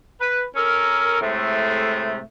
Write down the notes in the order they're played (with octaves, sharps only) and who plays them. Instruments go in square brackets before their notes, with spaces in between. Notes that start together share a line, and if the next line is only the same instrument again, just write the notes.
[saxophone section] B4
C#4 A4 A#4
A2 C3 G#3 A3